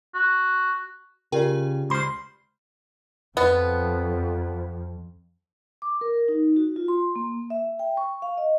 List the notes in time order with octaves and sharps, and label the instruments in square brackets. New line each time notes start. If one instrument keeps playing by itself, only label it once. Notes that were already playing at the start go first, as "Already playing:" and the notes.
[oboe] F#4
[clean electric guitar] C#3 [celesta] F4 G4 D5 [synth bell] A#4 G5
[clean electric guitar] C#2 C5 [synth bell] B5 F6
[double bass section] F2 [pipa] B3
[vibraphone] D6
A#4
D#4
F#4
F4
C6
A#3
E5
G5
C#6
F5
D#5